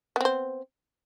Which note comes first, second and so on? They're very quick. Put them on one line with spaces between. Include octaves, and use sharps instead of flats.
B3 C4 C5